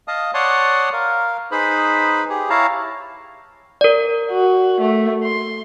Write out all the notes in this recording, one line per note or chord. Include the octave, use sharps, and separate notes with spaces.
D#5 F5 A5 D#6
C#5 D5 F#5 A5 C6 D#6
A#4 F5
D#4 G#4 B4 C5 B5
G4 G#4
E4 C#5 F5 A5 A#5
A#4 D5
F#4
A3
C6